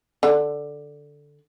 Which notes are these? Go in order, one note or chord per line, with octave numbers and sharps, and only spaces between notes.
D3